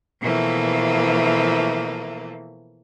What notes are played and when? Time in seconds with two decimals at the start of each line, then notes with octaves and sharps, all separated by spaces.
0.21 B2 E3 F3 A3 A#3